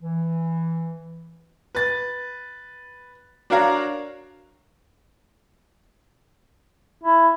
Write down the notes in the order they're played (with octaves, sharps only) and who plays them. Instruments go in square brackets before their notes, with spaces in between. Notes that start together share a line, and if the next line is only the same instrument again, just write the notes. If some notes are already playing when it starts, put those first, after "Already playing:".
[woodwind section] E3
[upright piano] B4 A6
D4 F#4 A#4 C#5 F5 A#5
[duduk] E4